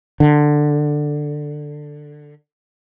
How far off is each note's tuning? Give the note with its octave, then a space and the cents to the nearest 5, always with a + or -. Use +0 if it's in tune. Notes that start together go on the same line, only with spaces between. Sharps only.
D3 +10